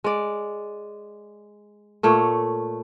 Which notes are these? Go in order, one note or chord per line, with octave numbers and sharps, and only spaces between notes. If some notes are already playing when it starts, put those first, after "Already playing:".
G#3 D5
A#2 A3 C#5